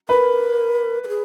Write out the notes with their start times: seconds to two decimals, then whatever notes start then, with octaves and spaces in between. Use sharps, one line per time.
0.09 A#4 B4
1.04 A#4
1.08 G#4